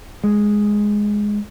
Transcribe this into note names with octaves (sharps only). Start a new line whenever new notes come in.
G#3